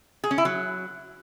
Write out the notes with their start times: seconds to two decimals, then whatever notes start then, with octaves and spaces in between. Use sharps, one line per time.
0.24 G#4
0.31 C#4
0.38 E4
0.45 F#3